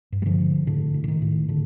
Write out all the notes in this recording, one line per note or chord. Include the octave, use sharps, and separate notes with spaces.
G2
G3
D3 F3
D3
A2 D3
A2
D3
D#3
A2
A2 D3